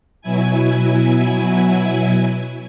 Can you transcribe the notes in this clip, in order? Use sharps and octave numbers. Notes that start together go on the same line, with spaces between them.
B2 F#3 E4 G#5